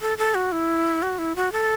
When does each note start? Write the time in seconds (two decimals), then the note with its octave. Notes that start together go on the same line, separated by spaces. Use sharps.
0.01 A4
0.18 A4
0.35 F#4
0.52 E4
1.02 F#4
1.19 E4
1.36 F#4
1.52 A4